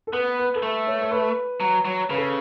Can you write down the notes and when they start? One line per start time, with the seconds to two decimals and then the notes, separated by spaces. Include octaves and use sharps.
0.07 A4
0.13 B3 B4
0.39 B4
0.55 A4
0.63 A3 B4
0.87 C#5
1.01 C#5
1.11 B4
1.60 F#3
1.85 F#3
2.09 C#3 B4
2.18 A4